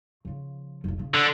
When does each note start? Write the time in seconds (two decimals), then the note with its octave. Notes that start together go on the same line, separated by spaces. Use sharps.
0.25 C#3 F3
0.84 F1 B1
0.99 C#3
1.14 D3